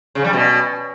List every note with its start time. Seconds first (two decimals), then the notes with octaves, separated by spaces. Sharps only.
0.15 C#3
0.24 G3
0.33 B2